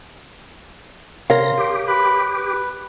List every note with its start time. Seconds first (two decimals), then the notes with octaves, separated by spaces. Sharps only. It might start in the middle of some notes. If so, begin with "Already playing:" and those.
1.30 C3 A#4 C#5 F5 C6 A#6
1.58 G4
1.88 B4 B5
2.36 B4